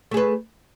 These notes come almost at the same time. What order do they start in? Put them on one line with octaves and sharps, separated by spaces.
A3 G#4 B4